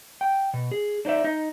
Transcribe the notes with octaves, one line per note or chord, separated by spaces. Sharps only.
G5
B2
G#4
D4 D#4 C5 D5 E5
D#4 D#5